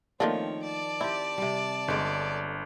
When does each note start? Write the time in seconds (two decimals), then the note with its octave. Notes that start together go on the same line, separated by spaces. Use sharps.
0.20 D#3 F3 A3 A#3 C4 D4 C#5
0.63 D5 A5
1.01 C4 E4 G4
1.38 C3 G3
1.88 G1 D3 G#3